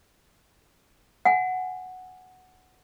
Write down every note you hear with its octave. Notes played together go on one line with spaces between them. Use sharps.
F#5 G#5